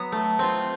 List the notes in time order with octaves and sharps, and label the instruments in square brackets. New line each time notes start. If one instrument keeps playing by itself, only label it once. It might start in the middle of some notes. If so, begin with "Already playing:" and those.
Already playing: [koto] F#3 B3
A3
C4 F4